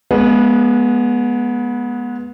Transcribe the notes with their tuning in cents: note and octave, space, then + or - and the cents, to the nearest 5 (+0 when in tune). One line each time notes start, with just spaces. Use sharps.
G#3 +20 B3 -20